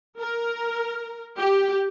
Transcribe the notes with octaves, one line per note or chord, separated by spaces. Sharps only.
A#4
G4